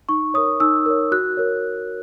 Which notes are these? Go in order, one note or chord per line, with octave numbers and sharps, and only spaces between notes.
D#4 C#6
A#4 C#5 D#6
D#4 E6
A#4 C#5
F#4 F#6
A#4 C#5